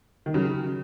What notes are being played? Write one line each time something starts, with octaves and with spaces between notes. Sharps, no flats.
D#3
C#3 F#3